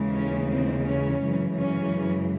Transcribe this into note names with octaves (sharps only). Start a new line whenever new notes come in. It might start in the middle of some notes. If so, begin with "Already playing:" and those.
Already playing: D#2 C#3 E3 G#3
C#4
C4
C#4
F#2 C#3 E3 G#3
C#4